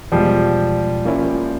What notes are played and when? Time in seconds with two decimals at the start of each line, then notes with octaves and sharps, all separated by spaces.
0.12 E2 B2 F3 G3 G#3
1.05 F3 A#3 C#4 E4